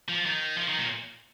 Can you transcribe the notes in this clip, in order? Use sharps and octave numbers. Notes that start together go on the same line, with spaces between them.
F3
D#3
F3
D#3
A#2